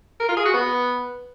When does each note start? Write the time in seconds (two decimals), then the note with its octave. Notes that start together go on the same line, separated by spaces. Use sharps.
0.20 A#4
0.28 F4
0.37 G#4
0.45 F#4
0.54 B3